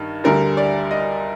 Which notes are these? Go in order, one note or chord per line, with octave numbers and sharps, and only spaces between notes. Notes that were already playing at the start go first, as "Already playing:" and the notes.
Already playing: G2 D#3
D2 D3 G3 A#4
D5
D#5